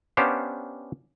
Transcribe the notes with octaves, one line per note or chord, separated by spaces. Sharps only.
B3 C#4 D4 G4 C5 F5